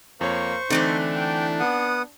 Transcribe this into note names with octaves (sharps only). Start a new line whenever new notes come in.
F2 A#3 C5 C#5 C#6
D3 E3 A3 C4 D4 D#4
G5
B3 F#5 D#6